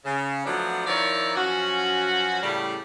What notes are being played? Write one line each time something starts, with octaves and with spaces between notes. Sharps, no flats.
C#3
F3 F#3 A3 B3 D4
D#3 F3 E4 A#4 C#5 D5
F#2 F3 C#4 F#4
A2 C#3 G3